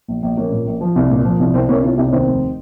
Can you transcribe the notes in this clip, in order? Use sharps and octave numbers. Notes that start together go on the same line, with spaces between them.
A#1
A#1
A#1 A#3 C#4
A#2
A#1
F3
C2
A#2
F3
C2
C2 C4
C2 A#3 C#4
C2 C#4 F4
C2 D#4 G4
C#4
D#2 C4 D#4
F1